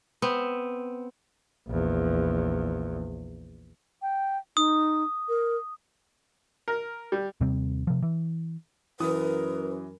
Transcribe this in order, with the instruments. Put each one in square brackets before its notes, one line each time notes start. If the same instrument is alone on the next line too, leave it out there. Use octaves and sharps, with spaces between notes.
[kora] B3 C4
[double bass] A#1 E2
[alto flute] G5
[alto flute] D#4 [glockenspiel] D#6
[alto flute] A#4
[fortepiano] A#4
G3
[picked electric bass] D#2 C3 G3 C4
C3 F3
E3
[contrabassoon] F#2 [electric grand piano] E3 D#6 [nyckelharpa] A#4 [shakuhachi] B4